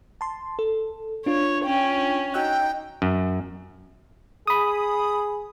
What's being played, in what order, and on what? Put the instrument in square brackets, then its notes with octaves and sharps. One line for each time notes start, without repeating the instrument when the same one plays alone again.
[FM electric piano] A5 C6
A4
[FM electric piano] D4 F4 [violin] C#5
[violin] C#4 [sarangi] G5
[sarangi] D#4 [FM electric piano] F#4 E6 F#6 [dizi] G5
[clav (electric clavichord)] F#2
[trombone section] G#4 [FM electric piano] B5 D#6